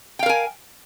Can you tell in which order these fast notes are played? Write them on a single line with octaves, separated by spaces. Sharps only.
G5 F5 A#4 G#5